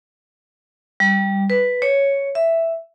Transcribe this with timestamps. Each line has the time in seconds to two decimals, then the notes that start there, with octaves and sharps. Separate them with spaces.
1.00 G3
1.50 B4
1.82 C#5
2.35 E5